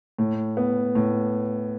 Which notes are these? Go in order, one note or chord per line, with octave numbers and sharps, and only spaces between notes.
A2
B3
A2